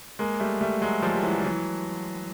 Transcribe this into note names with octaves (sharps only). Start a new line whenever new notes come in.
G#3 A#3
G3 A3
G3 A3
F#3 G#3
F3 G3
G3
E3 F#3
G3
E3 F#3